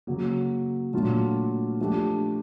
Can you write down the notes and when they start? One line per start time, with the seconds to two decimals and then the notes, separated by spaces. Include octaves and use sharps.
0.07 C#3 F#3 A#3
0.93 A#2 F#3 A3 D4 F4
1.79 F3 A3 D4 G4